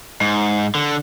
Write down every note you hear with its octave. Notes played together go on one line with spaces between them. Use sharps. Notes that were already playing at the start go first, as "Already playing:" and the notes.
G#2
D3